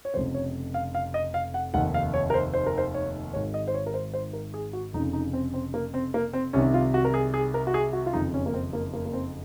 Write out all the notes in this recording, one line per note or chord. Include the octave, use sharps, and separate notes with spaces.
C#5
F1 F2 C#3 C5
C#5
F5
F5
D#5
F5
F#5
F1 D#2 D#3 F#5
F5
C#5
A#4
C5
C5
A#4
C5
C#5
G#1 G#2 D#3 C#5
D#5
C5
C#5
A#4
C5
C5
A#4
G#4
F#4
F1 F2 C#3 D#4
D#4
C4
C4
A#3
C4
A#3
C4
C2 C3 D#3 C#4
F4
F#4
A#4
G#4
G#4
A#4
F#4
G#4
F#4
F4
F#1 F2 D#3 D#4
C#4
A#3
C4
A#3
A#3
A#3
C4